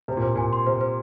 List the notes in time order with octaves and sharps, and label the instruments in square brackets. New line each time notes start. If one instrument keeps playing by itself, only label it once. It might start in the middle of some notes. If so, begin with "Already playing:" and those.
[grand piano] C3 [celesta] C5
[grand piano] A#2
[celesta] C5
[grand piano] A#2 [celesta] G#5
[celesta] C6
[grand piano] C3 [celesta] C5
[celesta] C5